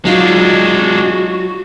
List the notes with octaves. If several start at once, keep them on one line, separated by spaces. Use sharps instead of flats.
F#3 G#3 D4 D#4 F4 F#4